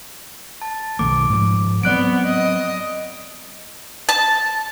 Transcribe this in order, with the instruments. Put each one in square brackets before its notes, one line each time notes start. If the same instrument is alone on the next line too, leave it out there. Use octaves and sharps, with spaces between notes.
[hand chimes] A5
[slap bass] B1 D#3 A3 [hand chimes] D6
[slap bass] G#2 F3
[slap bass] F#3 C4 [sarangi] B3 [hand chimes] D5 F#6 D7
[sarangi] D#5
[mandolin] A5